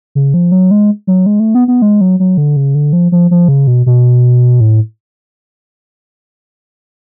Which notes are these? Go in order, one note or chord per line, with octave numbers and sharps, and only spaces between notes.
C#3
F3
F#3
G#3
F#3
G#3
A3
B3
B3
G#3
F#3
F#3
D3
C#3
D3
F3
F3
F3
C#3
B2
B2
A2